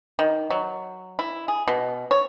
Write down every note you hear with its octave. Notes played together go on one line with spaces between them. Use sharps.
D#3
F#3
E4
G#4
B2
C#5